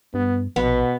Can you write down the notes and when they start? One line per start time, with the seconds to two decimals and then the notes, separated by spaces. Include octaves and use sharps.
0.14 G2 B3
0.56 A#1 B2 B3